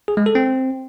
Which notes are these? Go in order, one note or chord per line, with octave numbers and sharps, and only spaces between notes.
G#4
G#3
A4
C4